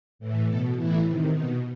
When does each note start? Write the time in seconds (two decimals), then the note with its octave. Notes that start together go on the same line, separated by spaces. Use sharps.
0.19 A2 E3
0.47 B2 A4
0.76 A2 E3 E4
1.05 C3 D#3
1.33 B2 D#4